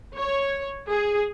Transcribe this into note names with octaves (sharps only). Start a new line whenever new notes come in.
C#5
G#4